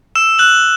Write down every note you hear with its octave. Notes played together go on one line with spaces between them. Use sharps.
E6 E7
F#6 F#7